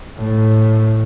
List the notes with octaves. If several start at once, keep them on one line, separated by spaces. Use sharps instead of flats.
A2